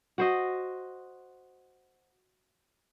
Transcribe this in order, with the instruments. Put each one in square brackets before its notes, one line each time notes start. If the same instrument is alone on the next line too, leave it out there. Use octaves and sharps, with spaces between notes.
[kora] F#4 C5 D#5